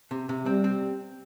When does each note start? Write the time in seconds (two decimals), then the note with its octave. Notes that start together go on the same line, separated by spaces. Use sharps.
0.11 C3
0.29 C3
0.46 G3 C4
0.64 C4